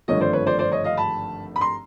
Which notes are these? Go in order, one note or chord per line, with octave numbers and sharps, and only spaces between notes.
G#1 G2 D3 F3 A3 C#5 D#5
C5 D5
B4 C#5
C5 D5
C5 D5
C#5 D#5
D#5 F5
A5 B5
B5
A#5 C6